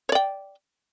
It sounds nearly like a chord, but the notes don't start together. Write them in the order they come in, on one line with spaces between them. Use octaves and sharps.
C#5 D5 G5